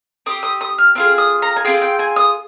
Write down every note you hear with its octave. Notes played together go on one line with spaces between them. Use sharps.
C4 G4 D#6
D#6
D#6
F6
C4 F4 G#4 F6
D#6
A#5
G#5
C4 F4 G#4 G5
G5
G#5
D#6